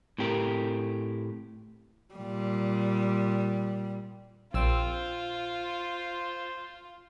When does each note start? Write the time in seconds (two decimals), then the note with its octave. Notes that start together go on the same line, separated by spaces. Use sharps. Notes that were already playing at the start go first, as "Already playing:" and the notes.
0.18 A2 C4 G4 A#4
2.15 A#2 G3
4.54 A#1 C4 F4 E6
4.92 C5